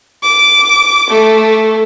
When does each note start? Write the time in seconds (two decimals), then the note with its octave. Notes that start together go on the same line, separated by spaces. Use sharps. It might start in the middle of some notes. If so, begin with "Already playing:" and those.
0.23 D6
1.10 A3